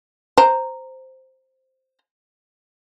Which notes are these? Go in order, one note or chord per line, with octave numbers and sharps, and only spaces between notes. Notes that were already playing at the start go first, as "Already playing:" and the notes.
C5 A#5